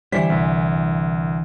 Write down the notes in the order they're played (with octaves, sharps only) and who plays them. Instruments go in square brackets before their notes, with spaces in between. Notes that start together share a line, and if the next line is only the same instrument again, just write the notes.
[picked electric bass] D3 E3 [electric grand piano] G3 C5 B6
[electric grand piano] C2